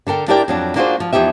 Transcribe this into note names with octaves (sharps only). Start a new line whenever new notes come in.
D3 A4 A#4 G5
D4 E4 G4 A#4 D5 G5
F2 F#3 D4
A#3 D4 F4 F#4 G#4 C5
F3
E2 F3 D#4 G4 E5